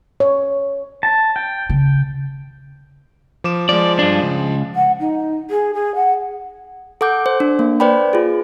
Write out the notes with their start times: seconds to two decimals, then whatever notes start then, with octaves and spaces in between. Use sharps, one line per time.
0.20 C#5
1.03 A5
1.36 G5
1.70 C#3
3.44 F3 D6 E7
3.69 F3 G#3 D5
3.99 G2 D4
4.22 C#2
4.75 F#5
5.00 D#4
5.50 G#4
5.74 G#4
5.95 F#5
7.01 A4 F#5 D6 G6
7.26 C5
7.40 D4
7.59 A#3
7.80 B4 C5 D5 G5 B5
8.13 F4 G#4